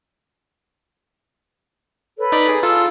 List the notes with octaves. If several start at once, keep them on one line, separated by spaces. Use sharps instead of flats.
A4 B4 C#5
D#4 D5 B5
G#4
F4 A4 A#5 E6